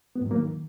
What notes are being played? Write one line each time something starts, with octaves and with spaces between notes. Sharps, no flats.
B3
G#2
F#3
A#3
D#3